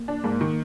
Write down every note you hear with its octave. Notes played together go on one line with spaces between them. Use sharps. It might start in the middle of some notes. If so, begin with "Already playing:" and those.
Already playing: A#3
D4
G#2 A#3
D#3